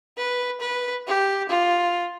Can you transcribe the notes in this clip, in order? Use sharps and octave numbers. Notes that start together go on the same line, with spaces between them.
B4
B4
G4
F4